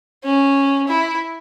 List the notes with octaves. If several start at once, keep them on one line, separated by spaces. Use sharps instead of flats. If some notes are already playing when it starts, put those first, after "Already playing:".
C#4
E4